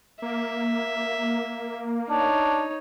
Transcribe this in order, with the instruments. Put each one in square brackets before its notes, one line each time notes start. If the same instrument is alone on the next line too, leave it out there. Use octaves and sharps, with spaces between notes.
[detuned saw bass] A#3 [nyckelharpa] E5
[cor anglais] D4 [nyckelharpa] D#4 C#5